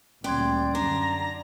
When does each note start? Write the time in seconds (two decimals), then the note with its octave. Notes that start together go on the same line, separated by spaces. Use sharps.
0.24 D2 A#2 G3 C#4 D5 G5 C6 G#6
0.75 F#2 D3 D4 A#5